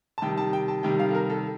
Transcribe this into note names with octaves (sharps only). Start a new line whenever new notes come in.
A5
C3 D#3 G3 G5
A5
G5
A5
C3 D#3 G3 G5
F5
A4
A#4
A4